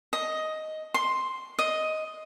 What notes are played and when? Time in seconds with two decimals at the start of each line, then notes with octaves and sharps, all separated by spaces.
0.13 D#5
0.94 C6
1.59 D#5